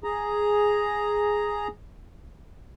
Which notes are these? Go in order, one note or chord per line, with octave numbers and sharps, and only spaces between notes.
G#4 A#5